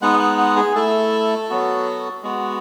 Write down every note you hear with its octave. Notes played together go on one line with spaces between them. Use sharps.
G#3 B3 D#4 F#5
F#5
F#5
G#4
A3 E4 A4
F#3 B3 F#4
G#3 B3 F#4